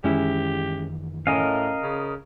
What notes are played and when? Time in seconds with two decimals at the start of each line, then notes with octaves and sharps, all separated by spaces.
0.04 F#2 D#3 E3 G#3 C#4 E4 G4
1.27 A2 C#4 A#4 D#5 F5
1.82 C#3